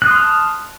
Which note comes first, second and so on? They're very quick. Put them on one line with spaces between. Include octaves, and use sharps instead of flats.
F#6 D#6 C6 F6 A5